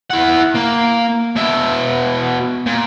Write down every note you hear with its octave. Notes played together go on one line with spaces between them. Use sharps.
E4 F#5
A#3
B2 E5
A#2